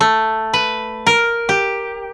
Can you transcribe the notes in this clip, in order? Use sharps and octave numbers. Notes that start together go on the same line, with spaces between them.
A3
B4
A#4
G4